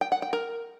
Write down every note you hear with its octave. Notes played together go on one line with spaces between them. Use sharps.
G5
F#5
G5
A#4